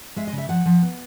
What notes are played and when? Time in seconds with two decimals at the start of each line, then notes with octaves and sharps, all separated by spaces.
0.16 G#3 E5
0.27 D#5
0.33 C#3
0.38 E5
0.49 F3 F#5
0.66 F3
0.82 B3